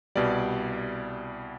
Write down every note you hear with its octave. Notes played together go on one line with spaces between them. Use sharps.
C2 B2 G3 D5